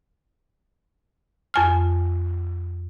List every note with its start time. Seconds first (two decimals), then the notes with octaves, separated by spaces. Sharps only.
1.54 F2 G#5 F6